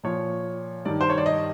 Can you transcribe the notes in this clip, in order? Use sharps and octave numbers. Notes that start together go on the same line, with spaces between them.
A#2 F3 C#5
G2 D#3 D5
C5
C#5
D5
D#5